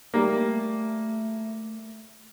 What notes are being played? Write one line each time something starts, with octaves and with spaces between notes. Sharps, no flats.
G3 A3 A#3